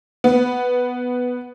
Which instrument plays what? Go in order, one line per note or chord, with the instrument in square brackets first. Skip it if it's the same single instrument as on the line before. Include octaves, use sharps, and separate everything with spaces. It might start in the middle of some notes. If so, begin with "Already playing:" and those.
[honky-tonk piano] B3